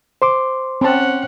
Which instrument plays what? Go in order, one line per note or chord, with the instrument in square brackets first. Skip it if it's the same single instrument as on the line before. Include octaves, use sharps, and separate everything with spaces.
[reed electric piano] C5 C6 D6
[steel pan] C4 A5 [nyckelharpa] C#4 F#5